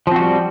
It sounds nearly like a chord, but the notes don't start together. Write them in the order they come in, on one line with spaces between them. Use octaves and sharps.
F3 C4 F#4 G3